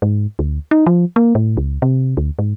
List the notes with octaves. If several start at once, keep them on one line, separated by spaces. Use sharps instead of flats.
G#2
D2
D#4
F3
A#3
A2
C#2
C3
D2
G#2